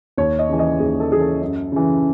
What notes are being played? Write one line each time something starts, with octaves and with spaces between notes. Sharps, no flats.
D#2 C#5
D#5
C#3 E3
D#5
D#2 G#4
A4
C#3 E3 G#4
A4
F#2
C#3 E3